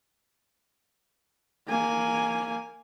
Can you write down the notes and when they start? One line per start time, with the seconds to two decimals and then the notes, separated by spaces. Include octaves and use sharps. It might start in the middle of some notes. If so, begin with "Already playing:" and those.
1.68 A#3 G#5